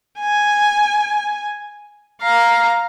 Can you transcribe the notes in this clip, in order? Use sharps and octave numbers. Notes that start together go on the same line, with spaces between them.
G#5
F5 A#5